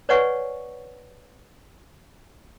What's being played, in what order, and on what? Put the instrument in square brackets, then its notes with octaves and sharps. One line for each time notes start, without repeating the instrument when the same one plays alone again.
[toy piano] B4 C#5 D5 F#5 G#5 C#6